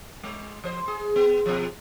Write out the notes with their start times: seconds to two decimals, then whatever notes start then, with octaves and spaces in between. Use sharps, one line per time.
0.24 G#3
0.64 F3 C5
0.88 G#4
1.16 B3
1.46 B2 F3